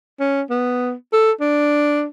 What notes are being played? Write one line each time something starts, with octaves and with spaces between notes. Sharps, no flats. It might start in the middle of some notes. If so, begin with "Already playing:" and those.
C#4
B3
A4
D4